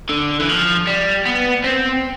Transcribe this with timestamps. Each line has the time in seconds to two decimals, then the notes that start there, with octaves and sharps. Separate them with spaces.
0.09 D3
0.40 E3
0.49 F3
0.87 G3
1.26 B3
1.64 C4